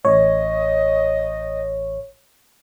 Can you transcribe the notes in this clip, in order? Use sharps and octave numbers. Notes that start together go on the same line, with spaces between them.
A1 C#5 D#5